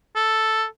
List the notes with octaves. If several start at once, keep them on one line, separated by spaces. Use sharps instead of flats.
A4